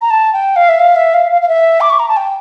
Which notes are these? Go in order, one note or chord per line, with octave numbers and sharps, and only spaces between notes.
A#5
A5
G5
F5
E5
F5
E5
F5
F5
F5
E5
D6
C#6
A#5
A5
G5